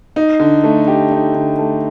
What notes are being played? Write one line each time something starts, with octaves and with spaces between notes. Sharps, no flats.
D#4
D3
A3
G4
D#4
D3
A3